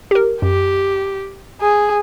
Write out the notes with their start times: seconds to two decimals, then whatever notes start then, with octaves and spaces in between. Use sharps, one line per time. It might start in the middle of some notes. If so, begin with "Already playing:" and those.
0.11 G4 A#4
0.42 F#2 G4
1.61 G#4